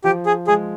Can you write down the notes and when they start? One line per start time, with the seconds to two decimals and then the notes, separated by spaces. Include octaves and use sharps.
0.04 F3 G4
0.26 G#4
0.47 G#3 G#4